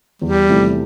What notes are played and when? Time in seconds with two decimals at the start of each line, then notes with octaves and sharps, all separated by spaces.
0.22 E2 G3
0.48 C3 F3 A3 E4